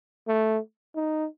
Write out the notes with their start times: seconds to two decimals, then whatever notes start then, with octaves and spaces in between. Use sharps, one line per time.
0.28 A3
0.96 D#4